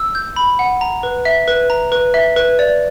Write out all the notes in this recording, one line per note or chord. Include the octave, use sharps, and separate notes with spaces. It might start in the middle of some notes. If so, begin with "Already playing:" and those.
Already playing: E6
G6
B5
F#5
A#5
B4
E5
B4
A#5
B4
E5
B4
D5